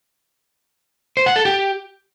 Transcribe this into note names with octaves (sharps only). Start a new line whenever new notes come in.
C5
F#5
A4
G4